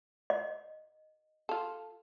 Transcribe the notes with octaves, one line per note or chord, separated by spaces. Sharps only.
D#5
F4 A4